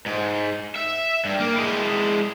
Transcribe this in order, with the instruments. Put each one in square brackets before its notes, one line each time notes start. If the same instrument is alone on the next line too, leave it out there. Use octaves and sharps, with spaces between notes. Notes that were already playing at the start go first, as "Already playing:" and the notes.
[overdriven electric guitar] G#2
E5
G2
A#3
G#3 E4